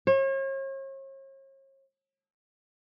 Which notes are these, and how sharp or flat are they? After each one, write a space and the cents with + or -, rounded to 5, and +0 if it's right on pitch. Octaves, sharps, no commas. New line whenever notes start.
C#5 -40